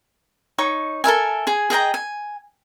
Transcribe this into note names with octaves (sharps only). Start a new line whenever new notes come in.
D#4 C#5 C#6
A4 A#4 E5 G#5
G#4 G#5
G#4 D#5 G5 A#5
G#5